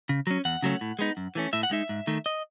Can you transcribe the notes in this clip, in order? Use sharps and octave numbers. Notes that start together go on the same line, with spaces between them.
C#3
F#3 C#4
E2 F#5
C#3 F#3 A3 C#4
A2
G#3 B3 D#4
F#2
E3 A3 C#4
A2 E5
F#5
G#3 D#4 E5
G#2
D#3 A3
D#5